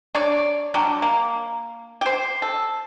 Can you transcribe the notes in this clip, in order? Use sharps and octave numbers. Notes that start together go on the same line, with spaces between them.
D4 C#5 D5
F#3 G3 D4
A#3
G4 C5
A4